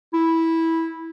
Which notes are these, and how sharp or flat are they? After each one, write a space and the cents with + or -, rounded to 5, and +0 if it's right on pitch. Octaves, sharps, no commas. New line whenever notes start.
E4 -10